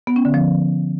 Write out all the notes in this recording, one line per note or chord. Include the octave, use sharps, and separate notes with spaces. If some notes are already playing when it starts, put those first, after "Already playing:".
B3
C#4
D3
F3